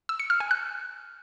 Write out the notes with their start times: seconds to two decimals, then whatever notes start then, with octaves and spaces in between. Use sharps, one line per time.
0.09 E6
0.20 C#7
0.30 F6
0.40 G#5
0.51 F#6